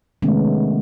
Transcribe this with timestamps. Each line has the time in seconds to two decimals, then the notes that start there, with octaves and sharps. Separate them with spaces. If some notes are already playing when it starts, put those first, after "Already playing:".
0.22 C3 D#3 G#3 A3 B3 C#4